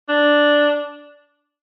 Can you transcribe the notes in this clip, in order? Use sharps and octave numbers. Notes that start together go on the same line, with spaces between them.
D4